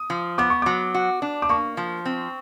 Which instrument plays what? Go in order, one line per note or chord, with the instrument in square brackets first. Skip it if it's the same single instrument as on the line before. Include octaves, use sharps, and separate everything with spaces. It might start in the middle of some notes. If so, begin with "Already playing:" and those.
Already playing: [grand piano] D#6
[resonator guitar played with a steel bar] F3
[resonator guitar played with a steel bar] B3 [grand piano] D6
[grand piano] C#6
[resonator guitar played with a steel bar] F#3 [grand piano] D6
[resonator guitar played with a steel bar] F#4
D4
[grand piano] D6
[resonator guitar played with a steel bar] A#3 [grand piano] C#6
[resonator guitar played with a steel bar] F3
C4